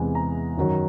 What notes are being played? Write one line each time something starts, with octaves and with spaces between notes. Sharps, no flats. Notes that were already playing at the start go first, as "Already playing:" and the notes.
Already playing: E2 C3 E3 G#3
A#5
F#2 D#3 F#3